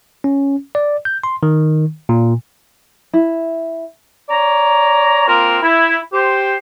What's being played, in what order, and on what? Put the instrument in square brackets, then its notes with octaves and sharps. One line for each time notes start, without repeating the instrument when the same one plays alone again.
[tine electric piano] C#4
D5
G6
C6
D#3
A#2
[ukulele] E4
[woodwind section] C#5 D5 A#5
A#3 C4 F4 A#4
E4
G4 C5